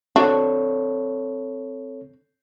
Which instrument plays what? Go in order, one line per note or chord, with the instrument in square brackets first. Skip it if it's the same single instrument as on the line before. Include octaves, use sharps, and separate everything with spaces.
[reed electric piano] C4 A4 C#5 [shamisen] D4 F#4